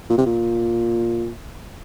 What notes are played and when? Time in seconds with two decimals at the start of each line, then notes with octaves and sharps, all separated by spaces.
0.09 A#2
0.18 C3
0.26 A#2